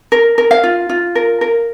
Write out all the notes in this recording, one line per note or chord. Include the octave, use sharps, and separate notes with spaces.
A#4
A#4
F5
F4
F4
A#4
A#4